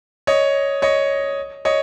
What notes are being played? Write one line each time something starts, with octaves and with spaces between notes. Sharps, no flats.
C#5 D#5
C#5 D#5
C#5 D#5